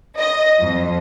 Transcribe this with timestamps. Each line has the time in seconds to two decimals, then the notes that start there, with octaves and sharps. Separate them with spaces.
0.17 D#5
0.63 F2